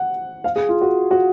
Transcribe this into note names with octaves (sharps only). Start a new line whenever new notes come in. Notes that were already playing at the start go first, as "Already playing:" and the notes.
Already playing: F#5
F5
G#4
F4
F#4
F#4